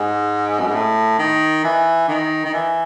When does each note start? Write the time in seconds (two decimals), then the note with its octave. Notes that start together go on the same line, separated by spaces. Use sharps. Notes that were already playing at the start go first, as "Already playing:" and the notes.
Already playing: G#2
0.60 F#2
0.67 G#2
0.74 A2
1.19 D#3
1.64 E3
2.09 D#3
2.45 D#3
2.53 E3